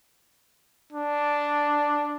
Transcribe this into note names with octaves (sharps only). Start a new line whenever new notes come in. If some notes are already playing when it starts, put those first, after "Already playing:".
D4